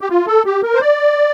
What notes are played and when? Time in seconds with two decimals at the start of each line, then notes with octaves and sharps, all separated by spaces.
0.01 G4
0.10 F4
0.27 A4
0.46 G4
0.63 A#4
0.75 C5
0.81 D5